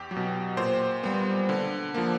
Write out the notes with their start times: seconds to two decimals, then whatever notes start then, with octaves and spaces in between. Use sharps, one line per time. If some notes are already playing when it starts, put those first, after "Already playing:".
Already playing: E2 G4
0.11 F#3
0.16 B2
0.57 A#2 C5
1.03 G3 B3
1.49 D3
1.94 F3 A#3